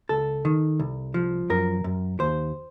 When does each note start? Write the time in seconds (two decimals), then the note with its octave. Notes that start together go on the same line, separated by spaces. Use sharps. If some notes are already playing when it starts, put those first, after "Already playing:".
0.09 C#2 A4
0.45 D#3
0.80 C2
1.14 F3
1.50 F#2 A#4
1.84 F#2
2.20 D#2 C5